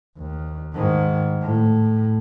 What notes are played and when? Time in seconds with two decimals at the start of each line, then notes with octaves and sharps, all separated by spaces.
0.18 D#2
0.75 G#2 D#3
1.42 A2